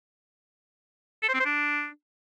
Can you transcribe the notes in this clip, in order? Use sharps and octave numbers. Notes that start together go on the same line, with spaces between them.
A4
C5
C4
C5
D4